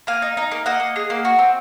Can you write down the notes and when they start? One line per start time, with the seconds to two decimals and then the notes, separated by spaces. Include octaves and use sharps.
0.07 A#3 F5 G#5
0.22 D#4
0.37 D#4
0.51 A#3
0.66 A#3 D#5 F#5
0.80 A#3
0.96 G#4
1.10 A#3
1.25 F#4
1.39 C4